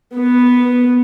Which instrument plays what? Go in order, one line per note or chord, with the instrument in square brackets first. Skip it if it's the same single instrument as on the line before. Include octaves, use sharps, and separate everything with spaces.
[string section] B3